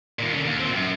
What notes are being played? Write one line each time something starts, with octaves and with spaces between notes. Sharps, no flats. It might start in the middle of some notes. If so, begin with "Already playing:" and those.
D#2 A#2
D3 C#4
D#2
A#2 C4
F#2